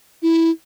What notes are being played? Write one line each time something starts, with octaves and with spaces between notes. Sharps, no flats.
E4